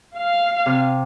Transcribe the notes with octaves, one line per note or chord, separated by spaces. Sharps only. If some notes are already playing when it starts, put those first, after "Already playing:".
F5
C3